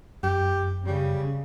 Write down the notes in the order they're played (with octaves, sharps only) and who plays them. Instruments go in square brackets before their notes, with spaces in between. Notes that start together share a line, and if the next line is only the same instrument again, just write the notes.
[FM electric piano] F#2 [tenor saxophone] G4
[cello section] C#3 [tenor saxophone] G3